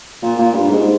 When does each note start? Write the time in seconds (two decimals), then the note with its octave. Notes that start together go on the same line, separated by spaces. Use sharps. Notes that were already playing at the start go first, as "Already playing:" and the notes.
0.22 A#2
0.39 A#2
0.54 G2
0.70 G#2